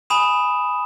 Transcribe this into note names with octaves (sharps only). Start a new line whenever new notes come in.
G#5 B5 D#6 E7